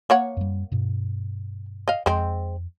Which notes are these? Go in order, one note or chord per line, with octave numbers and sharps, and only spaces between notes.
A#3 C#5 F#5
F#2 G3
G2 B2
D#5 F5
F2 G#3 C4